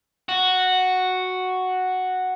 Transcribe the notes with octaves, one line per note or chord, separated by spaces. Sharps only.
F#4